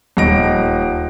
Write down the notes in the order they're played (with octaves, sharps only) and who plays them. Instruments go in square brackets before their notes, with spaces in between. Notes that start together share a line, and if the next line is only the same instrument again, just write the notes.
[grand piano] D#1 D#4 A#6 D7